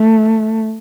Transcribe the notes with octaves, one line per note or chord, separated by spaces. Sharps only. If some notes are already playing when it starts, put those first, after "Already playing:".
Already playing: A3